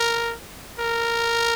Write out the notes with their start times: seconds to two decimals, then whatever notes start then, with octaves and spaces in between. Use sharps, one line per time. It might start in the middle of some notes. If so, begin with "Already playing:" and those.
Already playing: A#4
0.80 A#4